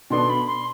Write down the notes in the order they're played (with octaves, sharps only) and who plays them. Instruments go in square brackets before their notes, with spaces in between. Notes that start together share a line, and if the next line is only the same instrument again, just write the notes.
[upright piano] B2 B3 D4 A4 [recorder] C6
[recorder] B5
C6